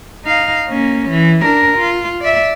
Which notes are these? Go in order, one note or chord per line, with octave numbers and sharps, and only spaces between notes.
D#4 F5
A#3 C#4
E3
D4 A#4
F4
D5 E5